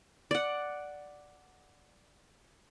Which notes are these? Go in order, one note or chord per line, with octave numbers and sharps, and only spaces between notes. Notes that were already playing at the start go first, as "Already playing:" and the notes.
D5 F#5